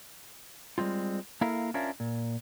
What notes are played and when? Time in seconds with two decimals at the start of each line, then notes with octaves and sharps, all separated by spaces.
0.78 G3 G#3 C4 F4
1.41 A#3 E4 A4 A#4 E5 F5
1.74 C#4 D4 F4 A#4 C#5 E5
2.00 A#2